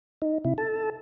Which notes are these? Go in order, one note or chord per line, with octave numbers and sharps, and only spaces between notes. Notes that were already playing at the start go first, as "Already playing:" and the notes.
D#4
C3 E4
A4 A5